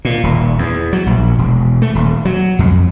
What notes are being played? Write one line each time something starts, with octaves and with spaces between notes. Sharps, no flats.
A#2
D#1
E2
F#3
A#1
E1
A3
D#1
F#3
F2